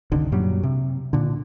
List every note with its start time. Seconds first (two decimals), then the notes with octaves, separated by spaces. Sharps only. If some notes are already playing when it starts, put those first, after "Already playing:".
0.12 F#1 C2 D3 D#3
0.32 F#2 A#2 F#3 G3
0.63 C3
1.13 A#2 D3